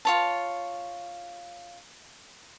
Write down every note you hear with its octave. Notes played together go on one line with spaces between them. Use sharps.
F4 C#5 A5